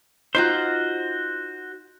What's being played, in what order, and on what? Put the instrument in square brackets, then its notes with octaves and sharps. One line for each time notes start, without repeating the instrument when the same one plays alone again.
[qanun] D#4 F4 A#5 [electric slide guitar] F#4 C5